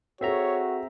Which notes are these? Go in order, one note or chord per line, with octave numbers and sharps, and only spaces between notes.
C4 F#4 G#4 A4 C#5 E5 A#5